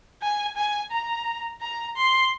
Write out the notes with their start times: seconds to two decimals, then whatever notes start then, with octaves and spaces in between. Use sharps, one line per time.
0.22 G#5
0.56 G#5
0.92 A#5
1.61 A#5
1.96 C6